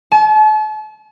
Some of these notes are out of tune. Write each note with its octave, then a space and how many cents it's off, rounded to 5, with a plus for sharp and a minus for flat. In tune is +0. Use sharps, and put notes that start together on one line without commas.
A5 -40